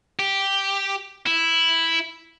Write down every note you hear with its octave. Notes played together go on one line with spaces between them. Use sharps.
G4
E4